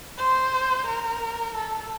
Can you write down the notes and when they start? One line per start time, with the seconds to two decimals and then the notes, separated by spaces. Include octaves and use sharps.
0.18 C5
0.87 A#4
1.55 A4